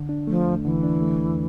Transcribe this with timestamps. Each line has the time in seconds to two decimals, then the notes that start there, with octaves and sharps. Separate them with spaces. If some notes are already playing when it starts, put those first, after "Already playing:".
Already playing: D3
0.09 D4
0.27 F3 A3
0.46 E2
0.64 D3 E3
0.83 D4
1.01 A3
1.20 E2